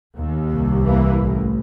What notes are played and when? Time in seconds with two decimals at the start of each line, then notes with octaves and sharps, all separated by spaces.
0.17 D#2
0.53 C2
0.85 E3 A#3
1.21 A1